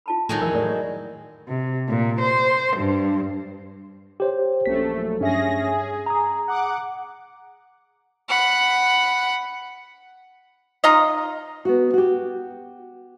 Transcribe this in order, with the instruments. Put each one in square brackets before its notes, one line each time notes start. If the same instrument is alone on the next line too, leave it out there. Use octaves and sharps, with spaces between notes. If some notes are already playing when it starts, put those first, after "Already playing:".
[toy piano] F4 A5 B5
[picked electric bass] A2 [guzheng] D#3 F#3 G#3
[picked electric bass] F2 E3 [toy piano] A#4
[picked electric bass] A2 [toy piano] D5
[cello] C3
A#2
C5
G2
[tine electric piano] G4 C5 C#5
[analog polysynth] A#1 F#2 A3 [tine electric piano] B6
[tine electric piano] G2 E5 [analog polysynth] C#4 G#4 A#6
[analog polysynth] G#4
[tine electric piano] A#5 D#6
[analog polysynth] F#5 D6
[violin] F#5 B5
[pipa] D#4 F4 D#5
[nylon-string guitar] B3 F#4
F#4 G4